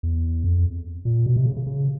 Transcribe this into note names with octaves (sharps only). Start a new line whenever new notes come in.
E2
F2
A#2
B2
C3
C#3
C#3
C#3